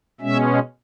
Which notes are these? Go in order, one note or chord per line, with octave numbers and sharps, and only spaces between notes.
B2 G#3 C#4 E5